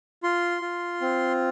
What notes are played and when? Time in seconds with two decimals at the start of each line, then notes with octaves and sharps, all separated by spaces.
0.23 F4 C6
0.62 F4
1.01 C4